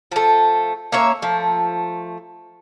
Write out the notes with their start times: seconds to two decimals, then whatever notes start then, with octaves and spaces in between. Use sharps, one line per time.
0.12 F3 A3
0.92 A#3 C#4 C#5 E5
1.22 F3 A3